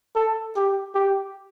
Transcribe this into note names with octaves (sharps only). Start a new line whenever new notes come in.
A4
G4
G4